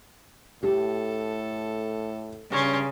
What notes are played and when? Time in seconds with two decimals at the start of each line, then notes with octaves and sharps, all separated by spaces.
0.63 A2 G4 A4
2.52 G2 C#3 C#4 C6